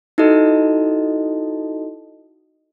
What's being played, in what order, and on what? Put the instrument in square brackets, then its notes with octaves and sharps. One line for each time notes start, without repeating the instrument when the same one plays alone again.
[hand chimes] D#4 E4 F#4 A4 D#5